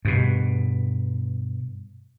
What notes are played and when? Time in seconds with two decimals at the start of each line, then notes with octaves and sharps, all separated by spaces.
0.05 G2 B2